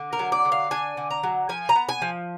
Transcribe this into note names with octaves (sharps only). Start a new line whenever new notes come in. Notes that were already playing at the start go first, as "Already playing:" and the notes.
Already playing: D3
A#4
F#3
D5
D3
F5
D4 G#5
D3
A#5
F#3
F3 G#5
A#5
B3
G#5
F3